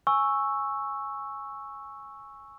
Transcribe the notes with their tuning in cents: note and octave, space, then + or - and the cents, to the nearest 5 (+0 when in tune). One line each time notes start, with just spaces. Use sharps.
G#5 +0 C#6 -5 E6 +0